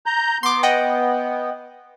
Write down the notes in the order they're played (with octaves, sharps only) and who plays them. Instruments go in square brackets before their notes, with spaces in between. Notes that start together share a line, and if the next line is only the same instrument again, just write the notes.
[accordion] A#5 G6
[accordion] B3 [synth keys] C6 D6
[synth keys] D#5 F#5 G5